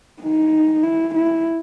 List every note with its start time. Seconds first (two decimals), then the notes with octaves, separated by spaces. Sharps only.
0.22 D#4
0.83 E4
1.15 E4